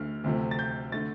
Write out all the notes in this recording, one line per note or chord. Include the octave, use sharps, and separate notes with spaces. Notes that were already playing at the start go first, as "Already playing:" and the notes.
Already playing: D2 D3 A3 F6
D2 C3 F3 A3
A6
G6
D3 A3 A6